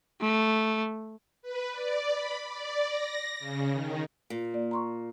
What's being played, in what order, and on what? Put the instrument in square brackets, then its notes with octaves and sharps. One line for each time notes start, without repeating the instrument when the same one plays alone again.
[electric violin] A3
[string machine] B4
D5
B5
D5
A#6
C#3
D#3
[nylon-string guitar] A#2
[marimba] A#3 D5
A#5 C6 C#6